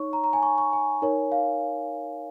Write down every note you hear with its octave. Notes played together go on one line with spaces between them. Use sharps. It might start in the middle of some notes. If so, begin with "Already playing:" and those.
Already playing: D#4 C#5 C#6
A#5
A#5
G#5
C#6
C#6
G#5
D#4 A#4 C#5
F5